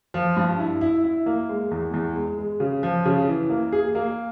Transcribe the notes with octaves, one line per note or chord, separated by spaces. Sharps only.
F3
G2
E4
E4
E4
A#3
G#3
E2
E2
G#3
G#3
C#3
F3
C#3
E3
A#3
G#4
A#3